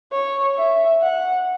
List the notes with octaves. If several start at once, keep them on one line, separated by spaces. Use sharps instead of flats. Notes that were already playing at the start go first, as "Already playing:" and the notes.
C#5
E5
F#5